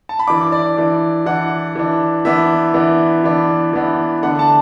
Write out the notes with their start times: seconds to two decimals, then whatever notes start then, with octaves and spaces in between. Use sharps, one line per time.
0.09 A5
0.19 B5
0.27 E3 D4 D6
0.52 D5
0.77 E3 D4
1.26 E3 D4 F#5
1.76 E3 D4
2.25 E3 B3 D4 E5
2.74 E3 B3 D4
3.24 E3 B3 D4
3.73 E3 B3 D4
4.22 D3 A3 D4 F#5
4.39 A5